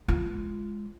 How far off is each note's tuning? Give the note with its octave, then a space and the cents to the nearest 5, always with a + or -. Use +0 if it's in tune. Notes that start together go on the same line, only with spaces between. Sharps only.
G#3 +0 F4 -20